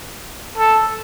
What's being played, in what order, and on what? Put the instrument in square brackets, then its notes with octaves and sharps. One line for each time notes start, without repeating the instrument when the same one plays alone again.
[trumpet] A4